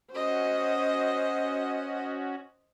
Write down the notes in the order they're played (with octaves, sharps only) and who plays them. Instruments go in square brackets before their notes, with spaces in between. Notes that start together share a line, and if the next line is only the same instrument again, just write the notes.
[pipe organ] C#4 F#4 [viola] C5 D#5